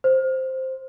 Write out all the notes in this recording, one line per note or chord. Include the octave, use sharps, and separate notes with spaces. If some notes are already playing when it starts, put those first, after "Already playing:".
C5